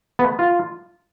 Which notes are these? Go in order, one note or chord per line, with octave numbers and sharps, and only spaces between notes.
B3
F4